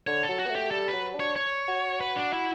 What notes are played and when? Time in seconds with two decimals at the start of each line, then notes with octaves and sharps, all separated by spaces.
0.07 D3 C#5
0.23 A4
0.29 F#3
0.39 F#4
0.46 B3
0.50 A3
0.55 G4
0.71 G3 A4
0.88 F#3 B4
1.15 D4 C#5
1.36 C#5
1.68 F#4
2.01 B4
2.16 D4
2.33 E4